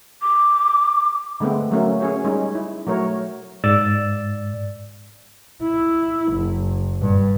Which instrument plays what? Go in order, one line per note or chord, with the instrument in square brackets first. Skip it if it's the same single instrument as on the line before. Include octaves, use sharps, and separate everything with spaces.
[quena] D6
[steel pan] D3 G#3 A3 B3 C4
F#3 A3 A#3 C#4
C#4 G#4 C#5
G3 G#3 C#4 D#4
E4
F#3 A3 A#4 C#5
[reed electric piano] G#2 D5 E6 A6
[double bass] E4
F#1
G2